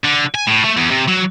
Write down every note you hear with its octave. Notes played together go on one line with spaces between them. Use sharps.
D3
G#5
A2
A3
E2
C3
F#3